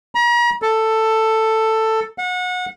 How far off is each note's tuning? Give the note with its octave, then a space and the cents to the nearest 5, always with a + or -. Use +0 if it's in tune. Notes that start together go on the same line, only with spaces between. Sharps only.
A#5 +40
A4 +10
F#5 -30